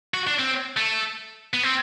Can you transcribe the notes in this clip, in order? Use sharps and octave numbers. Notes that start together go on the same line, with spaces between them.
F#4
D4
C4
A3
B3
C4